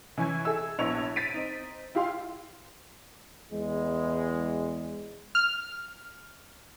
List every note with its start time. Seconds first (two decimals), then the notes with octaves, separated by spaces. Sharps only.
0.18 E3 C#4 E4 G#5 G#6
0.45 G#4 A4 E5 E6
0.79 A#1 B3 E4 C#5 F7
1.16 A6 B6 D7 D#7
1.34 C4 D#4
1.95 E4 F4 G4 F5 C6
3.52 E2 G#3
5.35 F6